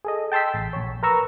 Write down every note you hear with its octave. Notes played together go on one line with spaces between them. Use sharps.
G#4 A4 D#5
G5 A5 C6 E6 B6
A1
A#1 C#5
A#4 B4 A#5 C#6 E6